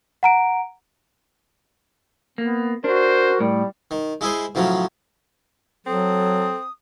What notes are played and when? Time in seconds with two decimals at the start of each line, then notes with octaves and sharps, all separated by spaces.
0.23 F#5 A#5 D7
2.38 A#3 B3
2.84 D4 F#4 A#4 C5
3.40 A2 G3
3.91 D#3
4.21 G#3 E4 G#4 C5
4.55 A2 C#3 F3 F#3
5.86 F#3 C4 A4 D#6